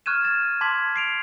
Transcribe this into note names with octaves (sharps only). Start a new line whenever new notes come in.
C#6 F6 F#6 G#6 D#7 E7
A6 E7
A5 C6 D6 G#6 B6 F#7
C7 D7 F7